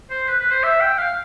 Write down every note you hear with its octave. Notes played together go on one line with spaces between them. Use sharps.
C5
B4
B4
C5
E5
G5
F5